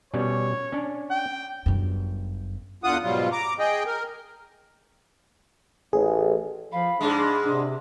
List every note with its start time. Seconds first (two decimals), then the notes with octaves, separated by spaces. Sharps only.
0.14 B2 G3 C#4 C#5
0.72 C#4 D4
1.10 G5
1.66 G1 F#2
2.84 E2 D3 F4 F#5 D#6
3.03 G#2 B2 F#3 G3 F4
3.32 A#5 D6
3.59 G#4 D#5 G5
3.87 A#4
5.93 A1 G#4
6.72 F3 F5 B5
7.01 G#2 G#3 D4 G#4
7.45 C3 D4